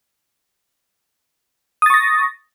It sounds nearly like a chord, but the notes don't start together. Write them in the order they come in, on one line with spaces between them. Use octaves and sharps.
D#6 A6 C#6 A#6